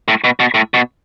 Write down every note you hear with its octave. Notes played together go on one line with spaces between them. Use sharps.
A2
B2
B2
A2
B2